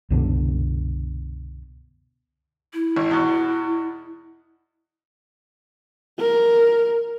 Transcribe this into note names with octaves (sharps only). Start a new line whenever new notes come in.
C2 F#2 B2 D3
E4
G#1
E2 B2
A#4